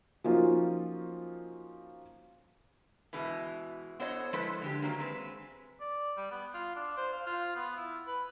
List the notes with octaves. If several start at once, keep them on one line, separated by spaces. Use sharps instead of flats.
F3 F#3 A#3 C#4 D#4 F4
B2 E3 G#3
B3 A4 C5 C#5 D#5 F#5
F3 G#3 E4 A4 B4
D3 G#3 G4
D#3 F#3 A#3
G#3 C4 B4
D5
G3
B3
F4
D4
C5
F5
F4
B3
E4
B4